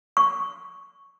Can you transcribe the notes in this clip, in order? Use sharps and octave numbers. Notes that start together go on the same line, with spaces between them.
C#6